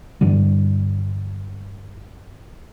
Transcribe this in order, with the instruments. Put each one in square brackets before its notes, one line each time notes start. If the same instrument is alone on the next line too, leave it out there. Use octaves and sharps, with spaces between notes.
[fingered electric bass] G2 D3 E3 G3